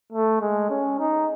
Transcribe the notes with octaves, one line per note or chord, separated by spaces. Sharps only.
A3
G#3
C#4
D#4